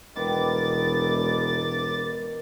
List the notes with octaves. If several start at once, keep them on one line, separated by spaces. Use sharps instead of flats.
E1 D#3 B3 D6 A6